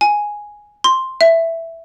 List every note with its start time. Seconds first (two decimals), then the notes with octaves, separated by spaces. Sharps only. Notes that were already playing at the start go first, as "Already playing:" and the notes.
0.01 G#5
0.84 C6
1.21 E5